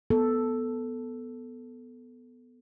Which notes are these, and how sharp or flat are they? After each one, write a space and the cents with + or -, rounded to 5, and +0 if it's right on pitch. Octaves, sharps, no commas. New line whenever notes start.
B3 +0 A4 +0